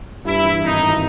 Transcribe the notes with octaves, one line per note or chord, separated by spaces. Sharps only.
G2 E4
E3
G#1 D#4
G#1